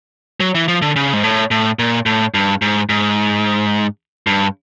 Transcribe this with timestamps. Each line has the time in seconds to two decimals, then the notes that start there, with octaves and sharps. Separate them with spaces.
0.40 F#3
0.55 E3
0.68 F3
0.82 D3
0.96 C#3
1.13 G#2
1.23 A2
1.51 A2
1.79 A#2
2.06 A2
2.34 G2
2.62 G#2
2.89 G#2
4.27 G2